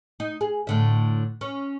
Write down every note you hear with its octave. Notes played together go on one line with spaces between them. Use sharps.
D#4
G#4
A2 D3 E5
C#4